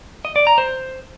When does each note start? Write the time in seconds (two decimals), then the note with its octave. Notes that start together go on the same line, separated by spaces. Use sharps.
0.25 D#5
0.36 D5
0.47 A#5
0.58 C5